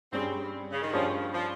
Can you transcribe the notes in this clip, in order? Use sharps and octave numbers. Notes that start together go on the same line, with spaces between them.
G2 G3 C4 C#4 G#4 C#5
C#3
D#3
G2 F3 G3 C#4 G#4 C#5
F3